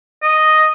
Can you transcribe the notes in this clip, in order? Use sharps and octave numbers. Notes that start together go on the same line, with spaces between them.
D#5